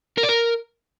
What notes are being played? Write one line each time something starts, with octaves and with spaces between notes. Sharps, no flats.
A#4
D5
A#4